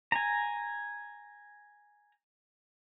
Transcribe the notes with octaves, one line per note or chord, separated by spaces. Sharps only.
G#5 A#5